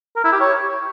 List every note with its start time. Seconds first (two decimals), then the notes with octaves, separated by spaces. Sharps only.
0.16 A#4
0.24 E4
0.32 G4
0.40 C#5